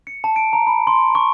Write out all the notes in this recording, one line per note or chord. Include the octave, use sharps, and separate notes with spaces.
C#7
A5
D7
A#5
B5
C6
C#6